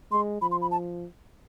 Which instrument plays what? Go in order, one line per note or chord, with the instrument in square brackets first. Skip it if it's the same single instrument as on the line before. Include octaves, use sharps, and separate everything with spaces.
[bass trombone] G#3 [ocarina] C6
[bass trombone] F3 [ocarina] B5
[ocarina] C6
B5
A5